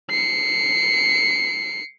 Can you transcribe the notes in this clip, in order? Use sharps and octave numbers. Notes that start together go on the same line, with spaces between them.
C7 C#7